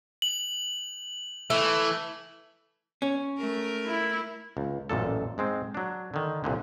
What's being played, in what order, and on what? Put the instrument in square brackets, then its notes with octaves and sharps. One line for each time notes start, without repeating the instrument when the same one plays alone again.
[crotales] F#7
[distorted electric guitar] E3 [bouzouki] A3
[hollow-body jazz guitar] C#4
[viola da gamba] A3 A#4
[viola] E4
[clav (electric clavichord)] C#2
A1 F#2 A#2 A4
G#2 G#3 C4
F#3 D4
D3 D#3
C2 A#2 D3